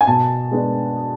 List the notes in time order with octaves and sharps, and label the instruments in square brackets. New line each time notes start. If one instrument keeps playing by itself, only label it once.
[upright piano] G#5
B2 A5
G#3 B3 D4